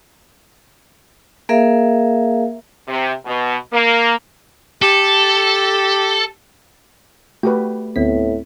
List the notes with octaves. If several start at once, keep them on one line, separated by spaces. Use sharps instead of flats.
A#3 G#4 A#4 E5 F5
C3
B2
A#3
G4 A4
A3 F#4 G4 B4 G5
D2 A2 B3 C4 B6